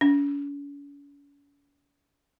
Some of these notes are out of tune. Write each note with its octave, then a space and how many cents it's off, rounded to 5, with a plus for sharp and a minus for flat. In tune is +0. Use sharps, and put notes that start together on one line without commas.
C#4 +45